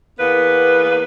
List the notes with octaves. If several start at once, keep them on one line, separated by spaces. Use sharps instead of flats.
E2 A#3 B3 B4